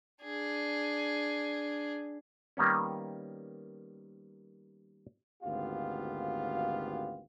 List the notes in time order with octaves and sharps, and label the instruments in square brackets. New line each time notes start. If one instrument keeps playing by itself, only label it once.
[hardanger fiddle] D4 G#4
[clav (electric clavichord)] D#3 G3 A#3 B3 C#4
[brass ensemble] G#1 D2 B3 F4 G4 F5